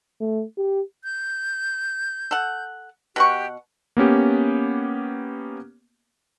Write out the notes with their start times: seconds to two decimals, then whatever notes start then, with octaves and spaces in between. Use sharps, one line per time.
0.20 A3
0.58 G4
1.04 G6
2.31 A4 F#5
3.16 B2 G4 F#5 C#6
3.97 A#3 B3 C#4 G4